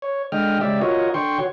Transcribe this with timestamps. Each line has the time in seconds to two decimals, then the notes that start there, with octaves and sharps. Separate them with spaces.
0.02 C#5
0.32 D3 G#3 D#5 G5 F6
0.61 C#3 G#3 G4 D5 E5
0.81 F4 F#4 A#4 C#5 D#5
1.14 D3 G5 C6 C#6
1.39 F#4 C#5